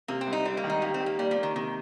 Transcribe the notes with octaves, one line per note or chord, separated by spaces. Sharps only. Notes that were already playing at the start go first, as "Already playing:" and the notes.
C3 A#3
C4
C2
D#4
G3 C4
A#3
D#3
D#4
A#3 G4
C4
G4
A#3
G3 A#3
F3
A#3
D#3
C3 D#3